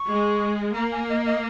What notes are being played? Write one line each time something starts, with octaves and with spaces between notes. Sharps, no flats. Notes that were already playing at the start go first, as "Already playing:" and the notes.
Already playing: C#6
G#3
A#3 A#5
G#5
D#5
D#5